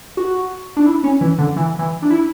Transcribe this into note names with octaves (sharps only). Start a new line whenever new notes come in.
F#4
D4
E4
C#4
E3
D3
E3
E3
D4
E4